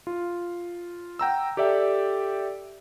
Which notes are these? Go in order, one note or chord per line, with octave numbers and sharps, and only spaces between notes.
F4
F#5 G5 A#5 E6
G4 A4 D5 E5 G5